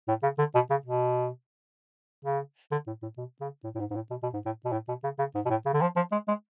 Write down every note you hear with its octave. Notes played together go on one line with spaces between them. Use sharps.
A2
C#3
D3
B2
C#3
B2
C#3
D3
A2
A2
B2
C#3
A2
A2
G#2
G#2
A2
B2
B2
G#2
A2
B2
A2
B2
C#3
C#3
G#2
B2
A2
C#3
D3
F3
F3
G#3
G#3